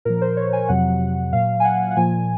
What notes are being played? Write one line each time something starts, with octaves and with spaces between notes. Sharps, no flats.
A#2 F3 A#4
C5
C#5
G#5
F2 C3 F#3 F#5
A#2 F#3 F5
G#5
F#5
F#5
A#2 F3 G#5